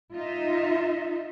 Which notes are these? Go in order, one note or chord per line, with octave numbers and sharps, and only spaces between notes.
D#4 F4 D#5 E5